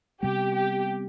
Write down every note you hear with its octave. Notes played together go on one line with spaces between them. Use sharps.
C3 G3 B3 G4
G4